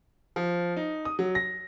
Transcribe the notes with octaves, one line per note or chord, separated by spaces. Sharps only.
F3
D#4
D#6
F#3
A#6